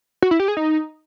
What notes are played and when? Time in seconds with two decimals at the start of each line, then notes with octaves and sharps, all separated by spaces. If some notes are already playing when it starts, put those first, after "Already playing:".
0.22 F#4
0.31 E4
0.40 G4
0.48 G#4
0.57 D#4